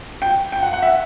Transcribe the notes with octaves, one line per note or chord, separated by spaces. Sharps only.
G5
G5
F#5
F#5
E5